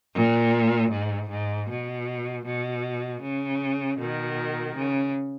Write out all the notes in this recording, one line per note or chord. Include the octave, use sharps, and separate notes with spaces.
A#2
G#2
G#2
B2
B2
C#3
B2 D#3
C#3